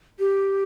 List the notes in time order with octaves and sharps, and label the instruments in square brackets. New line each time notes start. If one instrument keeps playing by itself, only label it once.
[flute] G4